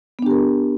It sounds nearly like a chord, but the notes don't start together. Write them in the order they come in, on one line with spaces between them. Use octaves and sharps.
B3 D4 G4 A#4